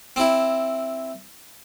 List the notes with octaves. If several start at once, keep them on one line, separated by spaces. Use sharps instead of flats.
C4 E4